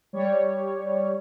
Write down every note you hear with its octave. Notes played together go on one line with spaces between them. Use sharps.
G3 C#5